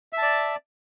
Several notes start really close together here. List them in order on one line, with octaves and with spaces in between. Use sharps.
E5 A5 D5